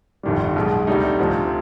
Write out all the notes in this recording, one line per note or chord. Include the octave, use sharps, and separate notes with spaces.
G1 F2 D#3 G3
B1 B2 G#3
D2 C3 G3 D#4
D2 C3 F3